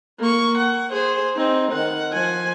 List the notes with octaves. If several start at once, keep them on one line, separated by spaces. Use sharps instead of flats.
A#3 C#6
F#5
G#4 C5
C4 D#4
D#3 F#5
F3 G#5